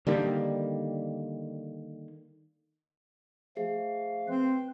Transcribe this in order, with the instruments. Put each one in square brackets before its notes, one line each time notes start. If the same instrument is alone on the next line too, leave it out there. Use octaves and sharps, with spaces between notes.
[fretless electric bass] D3 D#3 G3 A#3
[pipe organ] F3 A3 F5 [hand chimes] G#4
[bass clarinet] C4 [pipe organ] B4